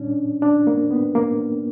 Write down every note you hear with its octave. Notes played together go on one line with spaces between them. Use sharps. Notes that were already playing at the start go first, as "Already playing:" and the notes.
Already playing: A#2 G3 C#4 D4
D4
A#3
B3
A#3